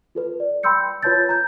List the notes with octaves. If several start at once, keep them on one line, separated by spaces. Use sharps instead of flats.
F4 A4 B4
D5
G5 B5 C6 E6 G6 C#7
F4 B4 C#5 A5 G6 A6
A#5 G6